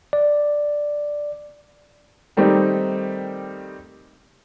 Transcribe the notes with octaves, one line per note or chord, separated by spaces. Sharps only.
D5
D#3 G3 A3 C4 D#4 G4